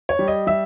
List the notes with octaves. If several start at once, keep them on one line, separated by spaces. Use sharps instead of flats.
C#5
G3
D#5
G3 E5